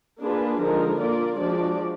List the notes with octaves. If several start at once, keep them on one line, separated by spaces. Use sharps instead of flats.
A#3 D4 F4 G#4 B4
D3 F3 G#3 D#4 A#4
A#3 F4 A#4 D5
F3 G#3 D4 F#4 D5